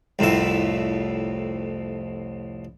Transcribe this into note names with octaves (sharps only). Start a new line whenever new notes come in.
C2 F2 A2 E5